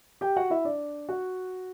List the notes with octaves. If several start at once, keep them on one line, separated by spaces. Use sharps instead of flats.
G4 G5
F#4 F#5
E4 E5
D4 D5
F#4 F#5